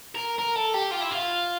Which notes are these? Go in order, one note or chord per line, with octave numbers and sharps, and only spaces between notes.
A#4
A#4
A4
G4
F4
E4
F4